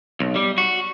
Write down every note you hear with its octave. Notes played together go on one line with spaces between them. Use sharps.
B1
G3
F#4